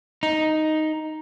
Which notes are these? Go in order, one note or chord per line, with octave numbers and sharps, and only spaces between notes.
D#4